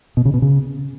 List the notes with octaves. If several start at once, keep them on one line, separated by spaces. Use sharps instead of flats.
B2
C#3
B2
C#3